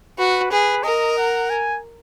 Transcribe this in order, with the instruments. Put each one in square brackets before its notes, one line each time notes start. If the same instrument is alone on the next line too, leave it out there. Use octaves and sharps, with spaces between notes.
[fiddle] F#4 [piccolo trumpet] B4
[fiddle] G#4 [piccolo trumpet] B4
[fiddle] A#4 [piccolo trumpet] D#5
[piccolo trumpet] F#5
G#5